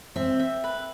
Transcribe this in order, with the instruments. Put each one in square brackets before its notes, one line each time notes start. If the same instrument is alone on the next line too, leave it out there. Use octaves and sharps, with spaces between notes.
[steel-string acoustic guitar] C4 [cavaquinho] E5
[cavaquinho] E5
B4